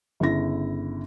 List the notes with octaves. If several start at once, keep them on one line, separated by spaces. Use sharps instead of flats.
G1 C#3 E4 A#6